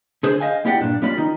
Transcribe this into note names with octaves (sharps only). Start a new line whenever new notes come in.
D3 G#4 C5
C5 D#5 F5 G#5
A#3 E4 G4 D5 F#5 G5
G2 A#2 D4
G3 A#3 C#4 F4 D5 B5
D#3 D#4